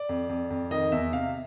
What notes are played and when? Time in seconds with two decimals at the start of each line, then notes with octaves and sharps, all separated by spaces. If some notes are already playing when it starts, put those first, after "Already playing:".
Already playing: D5
0.09 F2
0.29 F2
0.50 F2
0.71 D#3 D#5
0.92 E2 E5
1.13 C3 F5